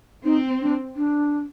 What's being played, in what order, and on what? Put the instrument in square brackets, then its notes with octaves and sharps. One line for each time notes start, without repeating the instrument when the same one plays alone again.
[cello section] C4 [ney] D#4
[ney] D4
D4